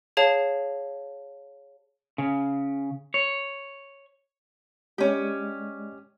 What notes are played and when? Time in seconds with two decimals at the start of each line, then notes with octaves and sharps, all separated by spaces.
0.17 G#4 C#5 F5 A5
2.18 C#3
3.14 C#5
4.98 G#3 C#4 G4 D5 D#5